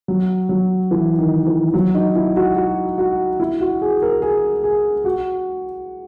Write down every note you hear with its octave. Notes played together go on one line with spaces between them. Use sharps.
F#3
F#3
E3
D#3
E3
F#3
D#4
E4
F#4
F#4
F#4
E4
F#4
G#4
A#4
G#4
G#4
F#4